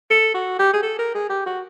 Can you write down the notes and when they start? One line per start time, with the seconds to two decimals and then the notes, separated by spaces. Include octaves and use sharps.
0.11 A4
0.34 F#4
0.59 G4
0.74 G#4
0.83 A4
0.99 A#4
1.15 G#4
1.30 G4
1.46 F#4